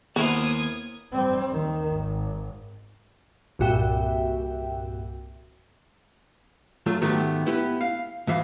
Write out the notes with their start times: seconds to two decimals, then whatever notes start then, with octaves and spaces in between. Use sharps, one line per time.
0.16 D#2 B3 E4 F#4 A#4 C5 D#6 G#6
1.12 G3 C4
1.50 D#2 D#3
1.92 G#1
3.59 C2 G2 A#2 F#4 E5 G5
6.86 F#3 A3 F4
7.01 G#2 D#3 F#3 A3 B3 G4
7.46 B3 E4 G4 B4
7.81 F5
8.27 G#2 E3 E5 F5